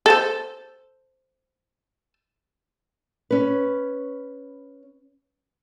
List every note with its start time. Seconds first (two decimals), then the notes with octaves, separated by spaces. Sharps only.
0.06 A4 C5
3.31 C#4 B4